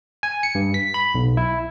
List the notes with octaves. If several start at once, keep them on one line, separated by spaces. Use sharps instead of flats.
G#5
C#7
G2
B6
B5
B1
E4